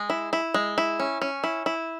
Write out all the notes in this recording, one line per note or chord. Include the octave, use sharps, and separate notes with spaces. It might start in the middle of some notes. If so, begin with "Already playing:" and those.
Already playing: G#3
E4
E4
G#3
E4
C#4
C#4
E4
E4